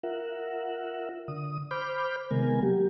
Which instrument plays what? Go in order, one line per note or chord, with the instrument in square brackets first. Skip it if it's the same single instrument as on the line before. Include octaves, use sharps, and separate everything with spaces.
[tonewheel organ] F4 A#4 E5 F#5
D3 D#6
C5 B5 D6 F6 G6
C3 D#3 G#3 B3 A#4 G#5
F#3 A#3 G4